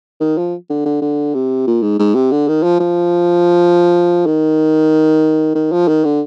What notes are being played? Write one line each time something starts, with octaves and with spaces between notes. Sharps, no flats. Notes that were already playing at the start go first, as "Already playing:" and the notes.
D#3
F3
D3
D3
D3
C3
A#2
G#2
G#2
C3
D3
D#3
F3
F3
D#3
D#3
F3
D#3
D3